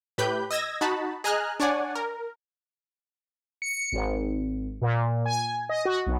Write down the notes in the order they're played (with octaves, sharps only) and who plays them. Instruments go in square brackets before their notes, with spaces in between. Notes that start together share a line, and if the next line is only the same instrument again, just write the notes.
[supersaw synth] A2 G4 B4 B5 G6
D#5 E6 G#6 A#6
D#4 F#4 A5 B5
G#4 D#5 G#5 A#5 F6 F#6
D4 C#5 D5 F#5 G#5
A#4
[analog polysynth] C#7
G#1
A#2
G#5
D#5
F#4
B1